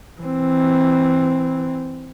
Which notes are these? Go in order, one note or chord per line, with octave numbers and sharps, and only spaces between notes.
E3 C4